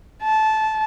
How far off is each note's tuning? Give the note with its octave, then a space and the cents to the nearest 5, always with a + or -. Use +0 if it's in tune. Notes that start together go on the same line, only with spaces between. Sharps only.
A5 -15